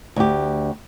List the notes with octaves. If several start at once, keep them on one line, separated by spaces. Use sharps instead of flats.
D2 G4